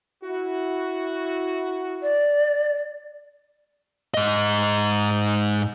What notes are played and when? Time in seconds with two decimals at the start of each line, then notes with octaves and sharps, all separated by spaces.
0.24 E4 F#4
2.03 D5
4.14 G#2 D#5